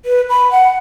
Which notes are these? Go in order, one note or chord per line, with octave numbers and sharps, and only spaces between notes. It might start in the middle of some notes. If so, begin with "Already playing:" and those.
B4
B5
F#5